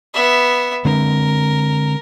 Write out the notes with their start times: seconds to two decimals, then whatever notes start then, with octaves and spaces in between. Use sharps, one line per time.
0.14 B3 E5
0.85 D3 G#3 C4 A#4